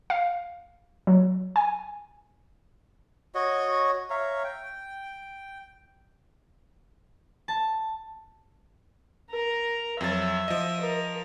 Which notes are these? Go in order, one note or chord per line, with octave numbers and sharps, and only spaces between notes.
F5
F#3
G#5
F#4 C#5 D#5
C#5 E5 F5 A#5
G5
A5
A#4
F2 F#3 E5 A6
F3 D#5
A#4